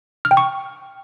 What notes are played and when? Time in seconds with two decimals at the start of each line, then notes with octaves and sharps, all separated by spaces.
0.25 F6
0.31 G5
0.37 C#6